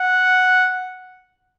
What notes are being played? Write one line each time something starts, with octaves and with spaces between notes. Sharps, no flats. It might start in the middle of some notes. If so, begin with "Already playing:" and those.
Already playing: F#5